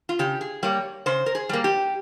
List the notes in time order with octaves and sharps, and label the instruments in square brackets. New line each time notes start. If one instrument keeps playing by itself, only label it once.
[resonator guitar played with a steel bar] F4
C#3 G4
G#4
G3 A#3 C#5
C#3 C5
A#4
G#4
G3 A#3
G4